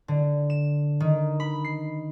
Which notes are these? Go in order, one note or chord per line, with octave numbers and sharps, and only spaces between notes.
D3
E7
D#3
B5
C7